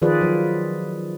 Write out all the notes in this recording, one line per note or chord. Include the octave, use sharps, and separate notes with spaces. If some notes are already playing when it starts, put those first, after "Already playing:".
D#3 F3 F4 G#4 B4 D5
F3 F#3